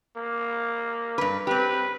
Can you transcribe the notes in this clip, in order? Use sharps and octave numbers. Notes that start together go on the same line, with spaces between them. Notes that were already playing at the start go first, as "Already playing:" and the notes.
A#3
G2 B4
C4 G4 B4